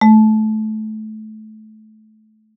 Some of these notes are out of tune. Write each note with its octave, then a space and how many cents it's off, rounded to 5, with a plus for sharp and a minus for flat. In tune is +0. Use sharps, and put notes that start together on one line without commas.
A3 -25